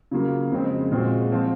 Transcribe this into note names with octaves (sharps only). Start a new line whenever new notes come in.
C#3 F#3 A#3 F4
F2 C#3 G#3 C4
A#2 G#3 C4 F#4
F3 C4 F4